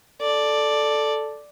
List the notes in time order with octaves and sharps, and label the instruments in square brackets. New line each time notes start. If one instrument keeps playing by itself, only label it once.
[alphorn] A4 [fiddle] D5